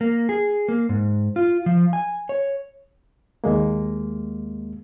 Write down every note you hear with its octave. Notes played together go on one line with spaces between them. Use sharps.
A#3
G#4
A#3
G#2
F4
F3
G#5
C#5
D#2 G#3 A#3